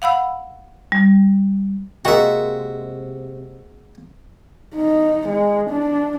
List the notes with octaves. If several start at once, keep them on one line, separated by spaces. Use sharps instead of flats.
F5 F#5 B5 E6
G3
C3 G#3 A#3 F#4 A#4 D#5 E5 G5
D#4
G#3
D4